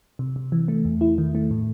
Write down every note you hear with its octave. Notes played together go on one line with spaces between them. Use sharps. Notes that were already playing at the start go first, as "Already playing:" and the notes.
C3
C3
E3
A3
E2
E4
D#3
A3
A2